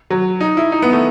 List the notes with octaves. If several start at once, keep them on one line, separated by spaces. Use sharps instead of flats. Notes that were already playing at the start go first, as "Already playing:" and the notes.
F#3
D#4
E4
D#4
B3
A3